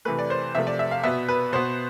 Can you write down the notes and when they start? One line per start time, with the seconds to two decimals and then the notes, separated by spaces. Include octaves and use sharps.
0.05 C3 E3 A3 B4
0.19 D5
0.30 C5
0.55 C3 F3 A3 E5
0.67 D5
0.79 E5
0.91 F5
1.03 B2 B3 E5
1.28 B4
1.53 B2 B3 C5